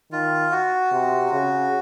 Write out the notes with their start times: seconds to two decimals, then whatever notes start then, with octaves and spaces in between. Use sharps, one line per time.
0.12 D#3 F4
0.52 F#4
0.92 C3
1.32 C#3